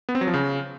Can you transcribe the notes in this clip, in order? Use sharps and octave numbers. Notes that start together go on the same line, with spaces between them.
B3
C4
F#3
F3
C#3